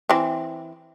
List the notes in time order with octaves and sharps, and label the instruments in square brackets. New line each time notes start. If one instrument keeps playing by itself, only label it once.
[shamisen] E3 C4